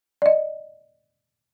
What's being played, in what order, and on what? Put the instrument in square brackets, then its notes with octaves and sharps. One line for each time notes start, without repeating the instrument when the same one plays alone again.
[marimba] D5 D#5